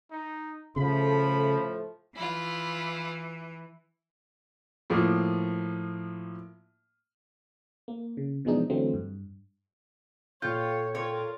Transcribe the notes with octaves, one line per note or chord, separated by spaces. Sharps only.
D#4
A2 C#3 F3 A3 B5
E3 E4 F4
A2 F3 A#3
A#3
C#3
B2 E3 F3 G#3 D4 D#4
D3 E3 F#3 A3 C4
G2
A#2 F4 A4 C#5 F5 G5 G6
F4 A#4 C#5